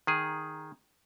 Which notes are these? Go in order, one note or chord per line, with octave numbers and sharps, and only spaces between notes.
D#3 G#4